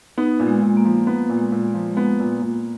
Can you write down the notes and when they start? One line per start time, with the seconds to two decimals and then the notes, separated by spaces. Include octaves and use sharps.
0.18 B3 D#4
0.40 A#2
0.47 G#3
0.62 A#2
0.77 A#3
0.85 F3
1.07 A#3 B3
1.30 A#2
1.38 G#3
1.52 A#2
1.67 A#3
1.74 F3
1.92 G#3
1.97 A#3 B3
2.20 A#2
2.42 A#2